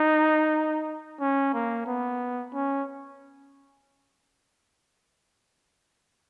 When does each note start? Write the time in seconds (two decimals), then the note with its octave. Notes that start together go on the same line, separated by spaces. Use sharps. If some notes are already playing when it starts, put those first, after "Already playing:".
Already playing: D#4
1.20 C#4
1.54 A#3
1.86 B3
2.53 C#4